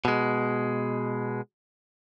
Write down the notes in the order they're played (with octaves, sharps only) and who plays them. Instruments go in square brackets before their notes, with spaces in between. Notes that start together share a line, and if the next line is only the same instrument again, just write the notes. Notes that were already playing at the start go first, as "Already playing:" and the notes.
[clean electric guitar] B2 G#3